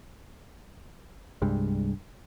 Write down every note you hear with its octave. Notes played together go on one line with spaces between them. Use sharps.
C2 G2 G3 G#3